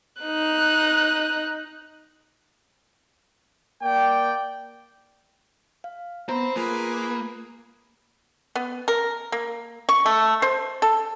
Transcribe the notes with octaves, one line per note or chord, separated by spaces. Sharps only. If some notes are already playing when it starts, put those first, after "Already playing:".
D#4 F#6
A#3 D5 G5
F5
B3 C4 C5 A#5 B5
A#3 F4 G#4 B4
B3
A#4
A#3
C#6
A3
C5
A4